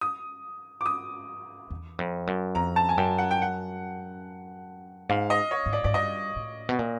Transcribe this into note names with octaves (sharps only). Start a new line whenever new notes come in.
D#6
D6
D#6
E2
F2
F#2
F2 A#5
A5
G#5
F#2 G5
F#5
G5
F#5
G#2 F5
D#5
C#5
G#2
D5
G#2 D5
G2 D#5
A2
B2
A#2